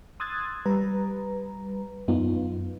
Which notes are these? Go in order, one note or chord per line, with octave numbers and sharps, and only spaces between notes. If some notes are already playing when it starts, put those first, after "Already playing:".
C6 D#6 E6 F#6 G#6 A6
G3 B4 A#5
F#2 B3 D#4 F4